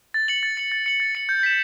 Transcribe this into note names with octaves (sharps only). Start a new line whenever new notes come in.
A6
C#7 F#7
A6
C#7 F#7
A6
C#7 F#7
A6
C#7 F#7
G6
B6 E7